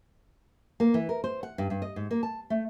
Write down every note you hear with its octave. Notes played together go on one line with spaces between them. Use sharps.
A#3
E3
A#4
C5
F#5
G2
G2
D#5
G#2
A#3
A5
A3